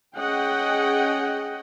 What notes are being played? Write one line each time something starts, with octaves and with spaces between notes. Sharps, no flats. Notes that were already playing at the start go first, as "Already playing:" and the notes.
C#4 G#4 D#5 F#5 G5